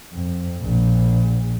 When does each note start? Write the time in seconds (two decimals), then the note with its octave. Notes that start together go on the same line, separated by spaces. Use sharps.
0.12 F2
0.61 A#1